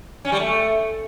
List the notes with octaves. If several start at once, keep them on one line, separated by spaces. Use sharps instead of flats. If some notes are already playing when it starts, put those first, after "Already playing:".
C#4
G3
A3